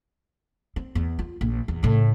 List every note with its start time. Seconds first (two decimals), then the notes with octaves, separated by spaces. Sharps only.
0.76 C4
0.95 E2
1.19 F4
1.41 A#1
1.68 E2
1.83 A2 C#3